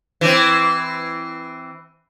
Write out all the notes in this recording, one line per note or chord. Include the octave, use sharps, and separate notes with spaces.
E3 C4